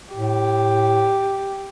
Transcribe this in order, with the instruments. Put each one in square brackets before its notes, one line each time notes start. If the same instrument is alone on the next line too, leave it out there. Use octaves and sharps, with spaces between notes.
[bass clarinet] A2 [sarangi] G4